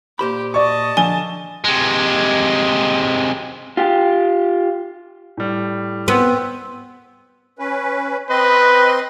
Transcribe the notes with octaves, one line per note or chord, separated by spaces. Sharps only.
A#2 G4 C5 B5
D5 D#5 A5 C#6
D3 F3 G#5 G7
C3 G#3
F4 G4
A2 G3
B3 C4
C#4 B4
C4 B4 D#5 C6